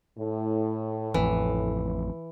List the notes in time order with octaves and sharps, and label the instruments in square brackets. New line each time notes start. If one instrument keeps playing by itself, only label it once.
[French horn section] A2
[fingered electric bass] A1 F2 [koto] E3